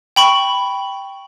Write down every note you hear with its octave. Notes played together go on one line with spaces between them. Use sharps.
G5 B5 C#6